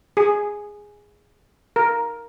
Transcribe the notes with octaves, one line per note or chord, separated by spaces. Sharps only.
G#4
A#4